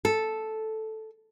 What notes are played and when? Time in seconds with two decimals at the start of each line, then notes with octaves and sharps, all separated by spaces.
0.05 A4